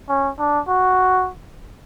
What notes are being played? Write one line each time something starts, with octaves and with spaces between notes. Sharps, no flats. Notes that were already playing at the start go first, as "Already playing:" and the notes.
C#4
D4
F#4